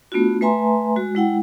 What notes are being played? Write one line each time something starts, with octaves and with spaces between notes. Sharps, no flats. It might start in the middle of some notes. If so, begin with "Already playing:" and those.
A3 B3 D4 F4 F#4
A3 B4 E5 G#5 A#5 C6
G#3 F#4
G#3 E4 F#5 G5